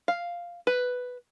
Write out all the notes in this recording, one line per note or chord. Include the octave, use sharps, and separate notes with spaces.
F5
B4